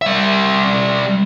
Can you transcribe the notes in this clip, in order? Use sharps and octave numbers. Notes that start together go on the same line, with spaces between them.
G3 E5